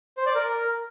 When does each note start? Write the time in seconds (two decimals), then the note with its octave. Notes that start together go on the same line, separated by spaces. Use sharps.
0.17 C5
0.26 D5
0.35 A#4